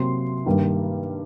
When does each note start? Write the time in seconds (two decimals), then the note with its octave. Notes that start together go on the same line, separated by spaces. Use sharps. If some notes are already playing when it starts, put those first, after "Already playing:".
Already playing: C3 F#3 A#3 C6
0.46 G2 D#3 G3 A#3